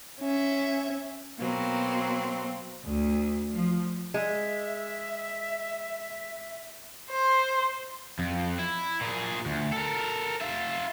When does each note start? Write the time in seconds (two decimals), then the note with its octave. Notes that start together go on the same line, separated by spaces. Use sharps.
0.20 C#4 E5
1.37 B2 F#3 A#3 C4
2.86 D2
3.53 F3
4.14 G#3 E5
7.10 C5
8.19 F2
8.59 E4
9.01 A#2 G#4
9.46 D2
9.73 A4 A#4
10.41 F4 E5